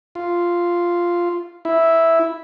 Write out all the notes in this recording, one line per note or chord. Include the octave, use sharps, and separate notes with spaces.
F4
E4